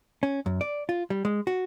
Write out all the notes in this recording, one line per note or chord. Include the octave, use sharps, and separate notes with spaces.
C#4
F#2
D5
F4
G3
G#3
F#4